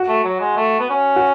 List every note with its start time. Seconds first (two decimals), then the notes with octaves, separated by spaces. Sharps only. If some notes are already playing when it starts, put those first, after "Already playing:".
Already playing: F#4
0.08 A3
0.24 F#3
0.40 G#3
0.57 A3
0.80 B3
0.90 C#4
1.16 F#4